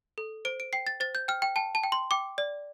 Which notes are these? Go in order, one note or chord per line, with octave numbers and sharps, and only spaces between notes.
A4
C5 D7
D7
G5 C7
A6
C5 A6
G6
G5 F6
G5
G5 A5
A5
G5
C6
G5 D6
D5